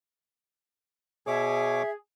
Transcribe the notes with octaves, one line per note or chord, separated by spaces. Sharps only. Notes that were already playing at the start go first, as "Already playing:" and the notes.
B2 G#4 C#5 E5 D6